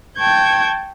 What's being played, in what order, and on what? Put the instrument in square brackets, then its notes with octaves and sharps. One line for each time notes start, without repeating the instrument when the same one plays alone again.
[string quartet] G5 A5 C#6 G6 G#6